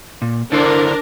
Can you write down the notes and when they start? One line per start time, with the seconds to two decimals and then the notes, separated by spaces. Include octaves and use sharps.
0.22 A#2
0.52 D3 D4 E4 A#4 C5